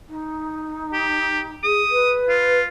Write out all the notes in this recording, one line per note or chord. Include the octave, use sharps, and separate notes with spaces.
D#4
G4
G#4 D#6
B4
F4